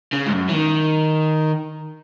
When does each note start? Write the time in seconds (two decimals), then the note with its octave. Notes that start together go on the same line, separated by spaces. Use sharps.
0.13 C#3
0.26 G#2
0.33 F#2
0.49 E3
0.53 D#3